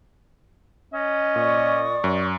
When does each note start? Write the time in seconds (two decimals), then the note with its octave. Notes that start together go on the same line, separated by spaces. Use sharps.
0.94 C#4 D#5
1.36 A#2 D5 C#6 D#6
2.04 F#2